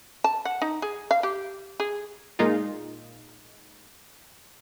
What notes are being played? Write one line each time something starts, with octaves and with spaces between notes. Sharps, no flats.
A5
F#5
D#4
G#4
F5
G4
G#4
A#2 G#3 D#4 F4